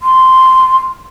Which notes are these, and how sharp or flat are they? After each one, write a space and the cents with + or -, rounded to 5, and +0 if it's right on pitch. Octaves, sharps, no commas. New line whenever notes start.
C6 -10